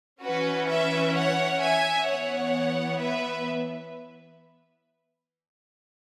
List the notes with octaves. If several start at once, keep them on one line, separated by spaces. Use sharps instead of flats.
E3 C#4 F#4 B4
B4 E5
C#5 F#5
E5 G#5
E3 B3 C#5 F#5
B4 E5